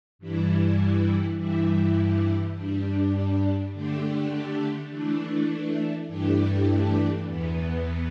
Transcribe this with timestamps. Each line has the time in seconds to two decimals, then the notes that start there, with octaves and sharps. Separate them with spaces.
0.19 G2 E3 G3 E4
1.37 G2 E3 G3 E4
2.55 G2 G3 D4
3.72 D3 A3 D4 G4
4.90 E3 A3 D4
6.07 G2 E3 A3 D4 G4
7.25 E2 E3 B3